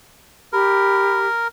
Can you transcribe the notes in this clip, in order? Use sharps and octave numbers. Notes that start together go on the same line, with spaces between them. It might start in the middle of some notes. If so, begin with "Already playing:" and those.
G4 A#4 B5